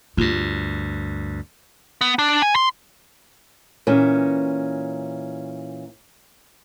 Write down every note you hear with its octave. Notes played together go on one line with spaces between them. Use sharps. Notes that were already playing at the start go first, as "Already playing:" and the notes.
D2 G2 F4
B3
D4
G#5
C6
A#2 E3 C#4